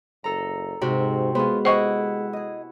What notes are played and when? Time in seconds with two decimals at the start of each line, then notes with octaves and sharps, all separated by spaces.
0.24 F#1 A4 A#5
0.81 G#2 C3 F#4
1.35 G#3 B3 F4 G#4 C5
1.65 E4 G4 C5 D#5 F#5 G5 C#6
2.33 G#4 D#5